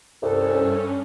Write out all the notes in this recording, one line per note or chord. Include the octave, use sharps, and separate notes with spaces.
C2 G2 C#4 A4